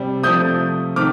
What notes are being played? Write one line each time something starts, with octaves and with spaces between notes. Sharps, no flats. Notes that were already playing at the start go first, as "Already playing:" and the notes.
Already playing: C3 G3
C3 F3 A3 D#6 G6
C3 D#3 A3 D6 F6